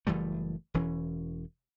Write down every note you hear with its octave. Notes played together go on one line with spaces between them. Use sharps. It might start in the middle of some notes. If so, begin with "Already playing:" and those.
F#1 E3 G3 A3
E1 E3 C#4